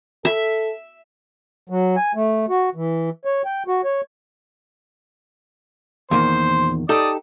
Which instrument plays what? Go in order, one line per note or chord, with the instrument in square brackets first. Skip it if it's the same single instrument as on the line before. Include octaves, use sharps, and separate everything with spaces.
[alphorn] A4 [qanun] E5
[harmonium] F#3
G#5
A3
F#4
E3
C#5
G5
F#4
C#5
[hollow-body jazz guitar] E2 A#2 D#3 [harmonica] C5
[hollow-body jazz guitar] D#4 G4 A4 [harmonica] D5 D#6